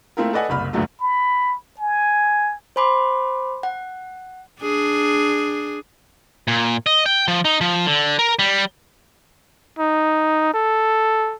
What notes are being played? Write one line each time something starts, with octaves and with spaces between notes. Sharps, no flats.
A3 A#3 C4 E4 F4 A#4
A4 B4 D5 D#5 F#5 G#5
F#1 C2 B5 F6
D2 G2 A#2 D3 F#3 A3
B5
G#5
C5 G#5 B5 C6 D6
F#5
D4 G#4
A#2
D#5
G5
F3
D#4
F3
D3
A#4
G3
D#4
A4